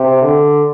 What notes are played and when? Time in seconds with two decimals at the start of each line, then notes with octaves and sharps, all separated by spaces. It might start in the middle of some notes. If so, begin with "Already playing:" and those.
Already playing: C3
0.22 D3